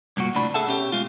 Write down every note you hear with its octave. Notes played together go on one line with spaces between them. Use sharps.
C2 G2 A#2 F#4
D2 A2 C3 D4 B5
G#4 A4 E5 F#5 A5
B2 C#4 G4
B2 G#3 F4